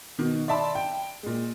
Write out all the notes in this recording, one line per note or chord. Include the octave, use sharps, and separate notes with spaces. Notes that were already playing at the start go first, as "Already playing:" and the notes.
B2 D#3
D5 E5 A5 B5 C6
G5
A#2 G#3